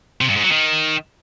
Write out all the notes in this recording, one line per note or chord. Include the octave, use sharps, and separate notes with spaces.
C3
G2
G#2
F#3
D#3